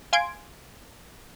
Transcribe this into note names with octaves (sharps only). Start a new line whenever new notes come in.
F5 G#5 C6 G#6 D7